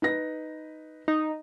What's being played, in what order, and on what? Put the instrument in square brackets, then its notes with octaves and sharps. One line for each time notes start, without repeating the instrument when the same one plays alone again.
[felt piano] D#4 B4 A#6
[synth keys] D#4